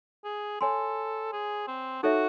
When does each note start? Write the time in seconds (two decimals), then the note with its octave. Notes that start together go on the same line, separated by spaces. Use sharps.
0.25 G#4
0.61 A4 C#5 G#5 C6
1.33 G#4
1.68 C4
2.03 D#4 F#4 A4 C#5 E5